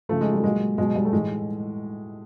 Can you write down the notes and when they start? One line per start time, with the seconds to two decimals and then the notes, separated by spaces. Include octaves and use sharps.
0.09 C#3 F3 A3
0.21 G#3
0.33 G3
0.39 A3
0.44 A#2 F#3 G#3
0.78 B2 F#3 G#3
0.95 G3
1.05 A3
1.13 A2 E3 G#3